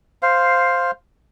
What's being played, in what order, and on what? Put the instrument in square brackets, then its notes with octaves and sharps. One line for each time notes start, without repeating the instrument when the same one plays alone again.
[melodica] C5 F5